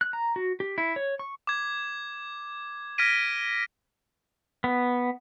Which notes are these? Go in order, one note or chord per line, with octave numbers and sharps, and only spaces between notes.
F#6
A#5
F#4
G4
E4
C#5
C#6
D6 G#6
F6 G#6 A#6 B6 D7 D#7
B3